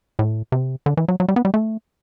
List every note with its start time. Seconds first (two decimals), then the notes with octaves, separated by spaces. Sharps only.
0.19 A2
0.52 C3
0.86 D3
0.97 E3
1.08 F#3
1.20 F#3
1.28 G3
1.36 B3
1.45 G3
1.54 A3